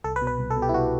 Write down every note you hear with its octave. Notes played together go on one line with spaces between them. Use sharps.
C2 A4
B4
B2
B4
C2
A4
B2
G4
E4
C2 F#4